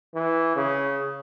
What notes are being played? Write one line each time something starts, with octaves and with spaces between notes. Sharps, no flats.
E3
C#3